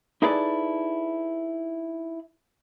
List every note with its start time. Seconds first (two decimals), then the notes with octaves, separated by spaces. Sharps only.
0.22 D#4 E4 G#4 A4 B4 D5